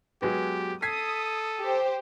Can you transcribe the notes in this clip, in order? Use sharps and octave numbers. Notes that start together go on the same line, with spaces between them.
F#3 G#3 B3 G4
A4 D#6 G#6 B6 C7
G4 C5